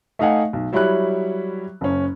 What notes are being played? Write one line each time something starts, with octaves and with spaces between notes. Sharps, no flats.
A3 D#4 D#5 F5 F#5 G#5
B1
F#3 G3 E4 C#5 B5 F#6
F#1 C#4